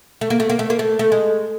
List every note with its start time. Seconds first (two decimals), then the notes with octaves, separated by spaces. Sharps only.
0.21 A3
0.30 A#3
0.40 A3
0.50 A#3
0.59 A3
0.70 A#3
0.79 A3
0.99 A3
1.12 G#3